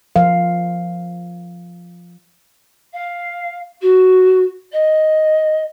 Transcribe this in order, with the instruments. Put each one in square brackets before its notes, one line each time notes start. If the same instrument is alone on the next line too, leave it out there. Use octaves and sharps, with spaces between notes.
[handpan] F3 A#4 F5
[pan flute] F5
F#4
D#5